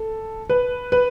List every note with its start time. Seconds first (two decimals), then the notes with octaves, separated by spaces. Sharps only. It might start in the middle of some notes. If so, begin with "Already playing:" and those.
Already playing: A4
0.50 B4
0.92 B4